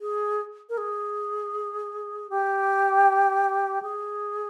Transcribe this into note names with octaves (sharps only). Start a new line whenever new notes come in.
G#4
A#4
G#4
G4
G#4